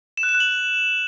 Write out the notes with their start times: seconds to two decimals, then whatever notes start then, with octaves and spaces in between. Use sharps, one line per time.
0.17 E7
0.23 F#6
0.29 E7
0.35 F#6
0.40 F#7